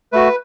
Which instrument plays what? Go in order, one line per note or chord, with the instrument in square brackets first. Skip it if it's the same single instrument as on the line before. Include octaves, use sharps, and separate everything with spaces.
[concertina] A3 F#4 B4